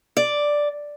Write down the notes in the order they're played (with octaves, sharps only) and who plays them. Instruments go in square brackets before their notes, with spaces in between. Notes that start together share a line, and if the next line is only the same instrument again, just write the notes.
[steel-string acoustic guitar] D5